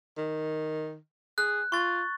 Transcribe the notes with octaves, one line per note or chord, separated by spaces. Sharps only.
D#3
G#4 F#6
F4 C#6 A6